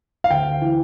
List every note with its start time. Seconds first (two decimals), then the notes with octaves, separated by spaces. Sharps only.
0.24 F5
0.31 D2 G5
0.62 E3